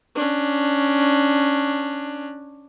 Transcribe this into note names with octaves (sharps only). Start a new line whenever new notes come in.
C#4 D4